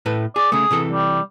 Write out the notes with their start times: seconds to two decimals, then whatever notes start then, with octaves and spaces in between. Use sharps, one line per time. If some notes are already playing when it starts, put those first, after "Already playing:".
0.06 A2 A3 B4
0.36 G#4 D5
0.52 C#3 A3 G#4
0.71 C3 E3 A4
0.93 G3